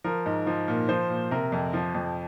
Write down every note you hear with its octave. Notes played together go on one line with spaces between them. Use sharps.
F3 A#4
G#2
F3
A#2
F3 C5
A#2
C3 A#4
F2
F3
F2